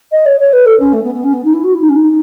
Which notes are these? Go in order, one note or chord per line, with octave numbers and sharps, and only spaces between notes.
D#5
C#5
C#5
B4
A4
C#4
A3
B3
B3
C#4
B3
D#4
E4
F#4
E4
D#4
C#4
D#4